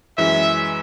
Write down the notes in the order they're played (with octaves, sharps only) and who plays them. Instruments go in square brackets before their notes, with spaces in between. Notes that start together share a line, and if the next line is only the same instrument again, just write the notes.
[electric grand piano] F#2 E3 G#3 C#4 [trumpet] E5